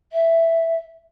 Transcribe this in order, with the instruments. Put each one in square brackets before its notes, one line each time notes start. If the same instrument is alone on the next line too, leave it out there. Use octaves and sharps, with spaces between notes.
[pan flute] E5